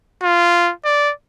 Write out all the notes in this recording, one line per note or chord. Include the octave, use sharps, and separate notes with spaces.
F4
D5